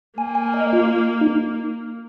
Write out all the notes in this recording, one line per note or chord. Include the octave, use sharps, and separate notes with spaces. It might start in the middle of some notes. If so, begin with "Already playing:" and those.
A#3 G#5
G#5
D#5
F4
D#4